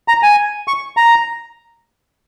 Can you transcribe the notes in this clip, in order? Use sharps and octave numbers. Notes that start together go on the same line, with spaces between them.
A#5
G#5
C#6
A#5